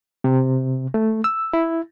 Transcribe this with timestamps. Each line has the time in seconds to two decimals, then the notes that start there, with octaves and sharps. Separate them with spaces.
0.24 C3
0.94 A3
1.24 E6
1.53 E4